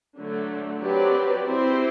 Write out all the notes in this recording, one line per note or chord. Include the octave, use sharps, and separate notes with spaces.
D3 F#3 A3
F#3 C4 G4 B4 D5
C4 E4 G4 C5